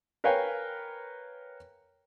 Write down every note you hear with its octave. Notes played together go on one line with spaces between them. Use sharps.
A#4 B4 C#5 F5 G5 G#5